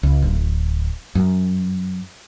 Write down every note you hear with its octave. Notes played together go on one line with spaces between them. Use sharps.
C#2
D1
F#2